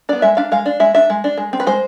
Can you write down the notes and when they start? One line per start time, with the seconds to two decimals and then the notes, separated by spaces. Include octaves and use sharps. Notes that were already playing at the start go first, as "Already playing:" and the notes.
0.09 B3 D4 D5
0.22 G#3 E5
0.37 D4 F5
0.52 G#3 F5
0.66 D4
0.80 G#3 E5
0.95 D4 E5
1.10 G#3
1.24 D4
1.37 G#3
1.53 C4
1.60 B4
1.67 G#3 C5